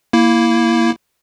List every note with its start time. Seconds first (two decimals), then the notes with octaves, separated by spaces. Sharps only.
0.13 A#3 E4